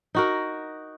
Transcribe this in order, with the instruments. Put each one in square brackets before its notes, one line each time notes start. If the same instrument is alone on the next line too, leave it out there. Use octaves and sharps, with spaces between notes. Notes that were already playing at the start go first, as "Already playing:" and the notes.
[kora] D#4 F#4 A#4